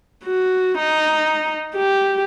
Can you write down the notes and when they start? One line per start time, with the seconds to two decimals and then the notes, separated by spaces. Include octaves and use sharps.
0.25 F#4
0.79 D#4
1.76 G4